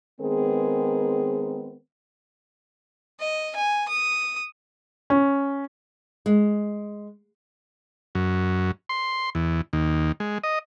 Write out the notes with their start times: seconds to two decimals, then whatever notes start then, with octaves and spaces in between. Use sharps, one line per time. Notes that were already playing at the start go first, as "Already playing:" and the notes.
0.21 D#3 G#3 B3 C4 G#4 A#4
3.20 D#5
3.56 G#5
3.88 D#6
5.10 C#4
6.26 G#3
8.15 F#2
8.89 C6
9.35 E2
9.73 D#2
10.20 G#3
10.44 D#5